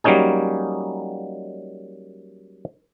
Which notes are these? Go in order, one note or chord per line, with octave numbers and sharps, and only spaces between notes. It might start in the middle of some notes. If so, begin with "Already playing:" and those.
F#3 G3 A#3 C#4 D#4 G#4